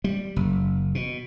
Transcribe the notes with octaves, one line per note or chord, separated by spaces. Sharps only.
G3
F#1
B2